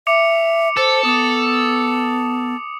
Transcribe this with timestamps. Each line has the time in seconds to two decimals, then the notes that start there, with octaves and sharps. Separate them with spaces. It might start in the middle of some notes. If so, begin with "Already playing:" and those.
0.07 E5 D6 C#7 F7
0.77 A4 C5
1.05 B3 D6 D#6